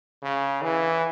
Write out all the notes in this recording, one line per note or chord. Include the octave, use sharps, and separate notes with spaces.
C#3
E3